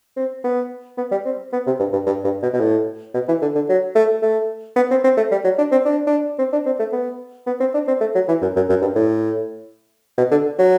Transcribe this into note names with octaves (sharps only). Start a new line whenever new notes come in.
C4
B3
B3
G3
C4
B3
C3
G2
G2
G2
G2
B2
B2
A2
B2
E3
D3
D3
F#3
A3
A3
B3
C4
C4
A3
G3
F#3
D4
C4
D4
D4
C4
D4
C4
A3
B3
B3
C4
D4
C4
A3
F#3
E3
F#2
F#2
F#2
G2
A2
B2
D3
F#3